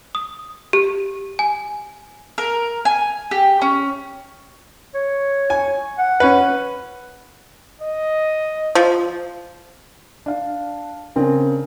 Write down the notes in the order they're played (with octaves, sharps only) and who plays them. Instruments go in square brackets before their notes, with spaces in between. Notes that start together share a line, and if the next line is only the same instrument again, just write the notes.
[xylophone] D#6
G4
G#5
[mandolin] A#4
G#5
G4
C#4
[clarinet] C#5
[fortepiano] G#5
[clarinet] F#5
[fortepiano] C#4 B4
[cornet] D#5
[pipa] F3
[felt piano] D4 F5
C#3 C4 D4 A#4